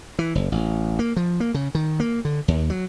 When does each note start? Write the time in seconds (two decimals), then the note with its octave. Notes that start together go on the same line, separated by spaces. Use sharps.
0.19 E3
0.35 F#1
0.52 A1
0.99 A#3
1.17 F3
1.40 A#3
1.54 C#3
1.75 D#3
2.00 A#3
2.25 D3
2.48 D#2
2.70 F#3